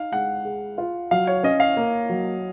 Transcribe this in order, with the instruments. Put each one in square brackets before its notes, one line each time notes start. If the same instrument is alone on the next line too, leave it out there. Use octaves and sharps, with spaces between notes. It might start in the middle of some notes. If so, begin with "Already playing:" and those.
Already playing: [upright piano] D#4 [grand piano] F5
[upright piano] G#3 [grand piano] F#5
[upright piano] G#4
F4
[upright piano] F#3 [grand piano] F5
[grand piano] C#5
[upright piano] C#4 [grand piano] D#5
[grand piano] F5
[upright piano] A#3
F#3